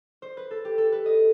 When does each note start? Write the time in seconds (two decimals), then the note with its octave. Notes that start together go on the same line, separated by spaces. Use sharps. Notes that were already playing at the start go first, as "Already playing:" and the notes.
0.22 C5
0.37 B4
0.51 A4
0.65 G4
0.78 A4
0.92 B4
1.06 D#5